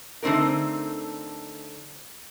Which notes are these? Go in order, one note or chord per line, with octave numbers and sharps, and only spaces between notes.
D3 A3 C4 D#4 A#4